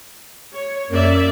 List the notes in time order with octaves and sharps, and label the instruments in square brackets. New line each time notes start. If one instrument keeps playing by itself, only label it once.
[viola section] C#5
[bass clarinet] F#2 [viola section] A#3 D5 E5